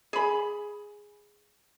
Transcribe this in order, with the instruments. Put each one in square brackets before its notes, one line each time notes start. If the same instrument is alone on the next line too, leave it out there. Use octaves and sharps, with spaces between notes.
[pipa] G#4 B5